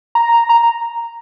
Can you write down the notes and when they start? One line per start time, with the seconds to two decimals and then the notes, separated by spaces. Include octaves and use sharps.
0.15 A#5
0.49 A#5